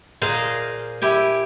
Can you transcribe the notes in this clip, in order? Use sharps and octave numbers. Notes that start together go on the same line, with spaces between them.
A#2 G#4 C5 D#5 F5 A#5
E4 G4 G#5